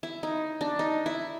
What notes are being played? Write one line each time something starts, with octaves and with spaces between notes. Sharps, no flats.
E4
D#4
D4
D#4
E4